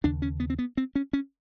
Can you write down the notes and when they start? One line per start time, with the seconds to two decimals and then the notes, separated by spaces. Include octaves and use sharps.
0.04 D#2 C#3 D4
0.22 C#4
0.40 B3
0.50 C4
0.59 B3
0.77 C4
0.95 C#4
1.13 C#4